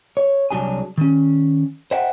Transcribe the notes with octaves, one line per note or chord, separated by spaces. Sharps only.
C#5
C2 F#3 D4 G#4 G#5
D#3 C#4
C5 D#5 E5 F#5 G5